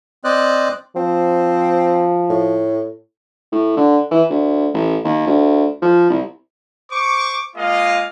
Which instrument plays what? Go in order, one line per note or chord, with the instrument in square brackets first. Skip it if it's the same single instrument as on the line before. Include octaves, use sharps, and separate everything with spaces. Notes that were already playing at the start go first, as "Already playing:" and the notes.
[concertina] C4 C5 D5 D#5 F#6
[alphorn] F3 [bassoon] C4
[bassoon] A2
[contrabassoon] A2
D3
E3
D2
A1
D#2
D2
F3
C2
[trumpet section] C5 C#6 D6
G#3 A#3 F4 D#5 F5